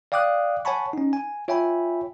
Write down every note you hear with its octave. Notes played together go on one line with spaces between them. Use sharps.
D5 F5 G5 D6 D#6 F#6
C#5 F#5 G#5 A5 B5 C#6
C#4 D#4
G#5
F4 C#5 E5 G5 G#5 B5